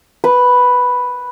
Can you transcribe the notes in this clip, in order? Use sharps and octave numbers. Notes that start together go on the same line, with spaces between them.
B4